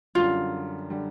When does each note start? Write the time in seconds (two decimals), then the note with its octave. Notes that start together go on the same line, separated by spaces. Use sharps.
0.15 F#2 D3 G3 F4
0.90 D3 G3